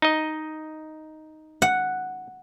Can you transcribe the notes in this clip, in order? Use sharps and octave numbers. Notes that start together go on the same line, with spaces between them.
D#4 D#5
F#5